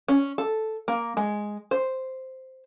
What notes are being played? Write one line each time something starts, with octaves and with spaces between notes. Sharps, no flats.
C#4
A4
A#3
G#3
C5